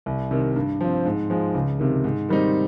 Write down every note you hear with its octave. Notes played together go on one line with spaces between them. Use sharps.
C2
C3 D#3
G2
F3 C4
G#2
F3 G#3
C#2
C3 D#3
G#2
D#3 G3 C4 D#4